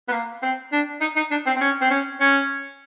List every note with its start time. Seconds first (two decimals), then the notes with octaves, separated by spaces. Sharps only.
0.09 B3
0.12 A#3
0.42 C4
0.72 D4
1.01 D#4
1.16 D#4
1.31 D4
1.46 C4
1.56 C4
1.61 C#4
1.81 C4
1.91 C#4
2.20 C#4